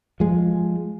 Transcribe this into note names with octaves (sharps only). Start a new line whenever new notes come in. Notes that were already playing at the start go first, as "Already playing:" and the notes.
F3 G#3